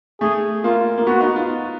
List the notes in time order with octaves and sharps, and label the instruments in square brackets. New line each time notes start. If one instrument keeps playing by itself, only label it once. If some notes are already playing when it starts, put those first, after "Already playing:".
[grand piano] A3 [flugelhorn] G#4
[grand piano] A#3 [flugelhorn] F4
[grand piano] A#3
[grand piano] B3 [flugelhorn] F#4
[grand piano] D#4
F4